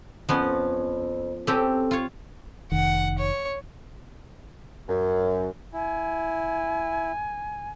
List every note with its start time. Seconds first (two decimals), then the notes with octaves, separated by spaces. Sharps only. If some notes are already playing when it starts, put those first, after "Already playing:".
0.29 F2 F3 B3 C#4
1.47 C4 C#4 G4 A4
1.91 F4 C#5
2.72 F1 D#3 F#5
3.18 C#5
4.89 F#2
5.73 E4 G#5